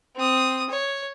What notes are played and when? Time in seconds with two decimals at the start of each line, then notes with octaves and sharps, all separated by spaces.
0.16 C4 D#6
0.70 C#5